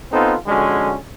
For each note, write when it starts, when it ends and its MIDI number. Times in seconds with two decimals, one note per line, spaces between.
0.11 0.35 59
0.11 0.35 60
0.11 0.35 63
0.11 0.35 65
0.11 0.35 69
0.47 0.96 41
0.47 0.96 50
0.47 0.96 56
0.47 0.96 61
0.47 0.96 66